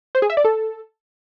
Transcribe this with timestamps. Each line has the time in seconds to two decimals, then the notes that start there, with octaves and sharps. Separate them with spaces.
0.15 C5
0.22 G#4
0.30 E5
0.37 D5
0.45 A4